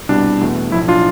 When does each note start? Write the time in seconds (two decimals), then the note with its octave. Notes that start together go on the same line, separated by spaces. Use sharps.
0.09 C2 B2 G3 D4
0.41 E2 B2 A3
0.72 B1 A2 F3 E4
0.88 D4 F4